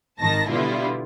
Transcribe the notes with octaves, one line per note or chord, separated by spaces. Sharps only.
G#1 D#3 A5 A#6
B2 D3 G3 B3 E4 F4